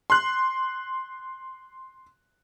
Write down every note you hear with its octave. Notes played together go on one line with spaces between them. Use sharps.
C6 F#6